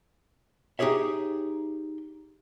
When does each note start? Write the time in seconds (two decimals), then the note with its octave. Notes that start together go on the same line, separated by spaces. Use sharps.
0.79 D#4 G4 G#4 C#5 E5